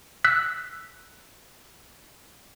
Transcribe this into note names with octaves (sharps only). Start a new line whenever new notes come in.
E6 F#6 B6